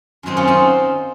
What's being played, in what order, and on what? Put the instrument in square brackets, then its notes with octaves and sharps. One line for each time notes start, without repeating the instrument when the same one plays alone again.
[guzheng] F#2 D#3 F#3 C4 D#4
C#4 F4
C4 D#4